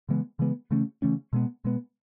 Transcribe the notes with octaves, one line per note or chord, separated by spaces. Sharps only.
C#3 E3 G#3 B3
C#3 E3 G#3 B3
C#3 E3 A3 C#4
C#3 E3 A3 C#4
B2 G#3 B3
B2 G#3 B3